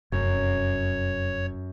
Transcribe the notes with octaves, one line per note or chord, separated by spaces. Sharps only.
F1 F#2 C#5